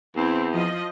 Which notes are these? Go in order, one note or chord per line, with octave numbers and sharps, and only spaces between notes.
E2 C4 E4
F3 D#5